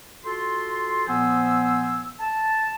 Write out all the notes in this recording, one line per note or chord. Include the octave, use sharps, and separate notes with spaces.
F4 F#4 A4 C6
A#2 F3 B3 C5 G#5 E6
A5